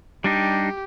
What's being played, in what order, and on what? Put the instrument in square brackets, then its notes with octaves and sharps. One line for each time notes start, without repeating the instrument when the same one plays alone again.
[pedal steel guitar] G3 D4 D#4 [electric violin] G4